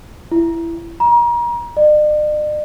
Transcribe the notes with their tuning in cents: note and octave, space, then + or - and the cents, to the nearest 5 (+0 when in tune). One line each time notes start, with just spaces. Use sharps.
E4 +15
A#5 +35
D5 +45